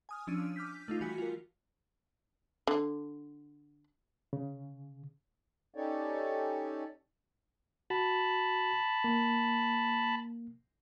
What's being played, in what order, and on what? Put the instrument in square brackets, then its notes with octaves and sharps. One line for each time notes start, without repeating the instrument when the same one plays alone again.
[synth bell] G#5 D#6 F6
F3 C#4 D4 E6 D7 D#7
D6 F6 G6 B6
A3 D#4 F4
E3 G3 F#4 G#5 B6 C#7
F4 A#4
[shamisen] D3
[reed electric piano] C#3
[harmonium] C#4 D#4 G4 A4 C#5 D5
[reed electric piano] F#4 [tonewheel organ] A5 B5
[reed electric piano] A#3